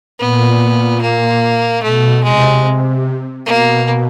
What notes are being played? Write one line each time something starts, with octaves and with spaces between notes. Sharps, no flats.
A#2 B3
A#3
B2 A3
C3 G#3
B2 A#3